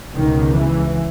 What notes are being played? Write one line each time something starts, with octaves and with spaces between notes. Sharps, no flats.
C#2 B2 D#3
E3